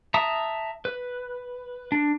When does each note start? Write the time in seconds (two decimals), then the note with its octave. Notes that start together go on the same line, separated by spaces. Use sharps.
0.14 E5 A5 A#5 D#6
0.85 B4
1.92 D4